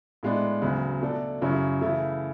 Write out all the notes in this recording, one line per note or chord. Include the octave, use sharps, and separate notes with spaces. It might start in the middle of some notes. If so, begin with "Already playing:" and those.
A2 G#3 B3 D4
D2 C#3 F#3 B3
B2 A3 D4 A4
F#2 C#3 F#3 C#4 E4
C#3 E3 A3 E4